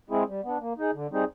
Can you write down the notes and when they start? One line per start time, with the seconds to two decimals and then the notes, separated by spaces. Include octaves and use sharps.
0.10 G#3 C4 E4 G#4
0.28 G3
0.44 B3 D4
0.60 A#3
0.78 D#4 G#4
0.94 D3
1.11 G3 C4 D#4 G#4